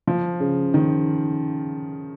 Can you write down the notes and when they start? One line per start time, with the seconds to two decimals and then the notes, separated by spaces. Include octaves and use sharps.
0.07 F3
0.40 C#3
0.74 D#3